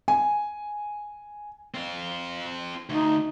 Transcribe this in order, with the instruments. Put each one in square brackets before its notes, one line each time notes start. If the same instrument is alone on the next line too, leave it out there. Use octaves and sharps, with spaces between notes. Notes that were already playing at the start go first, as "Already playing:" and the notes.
[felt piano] G#5
[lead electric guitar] C4 F4
[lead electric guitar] D2 [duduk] D#4